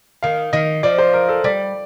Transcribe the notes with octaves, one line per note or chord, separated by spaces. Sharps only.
D#3 F5
D#3 D#5
F3 D5
C5
A#4
A4
G3 D5